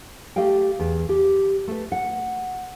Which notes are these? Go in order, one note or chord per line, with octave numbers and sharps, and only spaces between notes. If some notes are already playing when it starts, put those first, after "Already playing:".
A3 G4 D#5 F5 G5
E2
G4
A3 B4
F#5